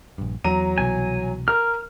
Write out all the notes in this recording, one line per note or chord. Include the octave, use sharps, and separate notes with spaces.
A#1 G2
E2 F#3 A#5 D#7
C2 B2 E3 G#5
A#4 F6